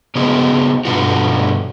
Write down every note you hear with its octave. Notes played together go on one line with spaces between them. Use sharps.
C#3 B3 F#4 G#4 D#5
G2 B2 D3 F4 F#4